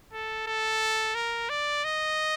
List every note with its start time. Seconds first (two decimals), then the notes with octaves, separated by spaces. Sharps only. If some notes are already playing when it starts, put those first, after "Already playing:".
0.13 A4
0.47 A4
1.15 A#4
1.50 D5
1.84 D#5